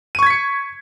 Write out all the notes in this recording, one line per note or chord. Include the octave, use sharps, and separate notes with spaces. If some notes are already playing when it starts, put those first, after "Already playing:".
C#6 G#6 B6 C#7 D#7